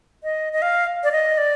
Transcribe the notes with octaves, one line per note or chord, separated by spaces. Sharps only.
D#5
D#5
F5
D5
D#5
D5